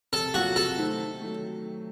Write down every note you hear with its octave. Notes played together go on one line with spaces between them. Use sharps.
C3 A4
F#3 A#3 F4 F#4
C3 A4
D#3 A3 C4 D#4
D#3
F#3 A3